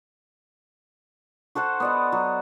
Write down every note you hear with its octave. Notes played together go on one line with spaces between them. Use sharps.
F#4 A4 C5 F#5
B3 D5 D#5
F#3